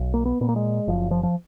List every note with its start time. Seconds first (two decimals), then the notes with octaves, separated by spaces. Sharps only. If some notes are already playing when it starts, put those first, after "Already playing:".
Already playing: B1
0.14 A#3
0.25 B3
0.41 A#2 B3
0.49 A#3
0.56 G#3
0.88 F#1 F3
1.11 F3
1.23 F3